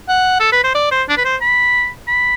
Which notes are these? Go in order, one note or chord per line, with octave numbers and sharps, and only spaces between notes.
F#5
A4
B4
C5
D5
C5
D4
B4
C5
B5
B5